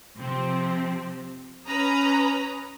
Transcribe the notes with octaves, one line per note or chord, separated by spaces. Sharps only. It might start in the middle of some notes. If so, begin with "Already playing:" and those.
C3 F3 C4
C#4 B4 A#5 D#6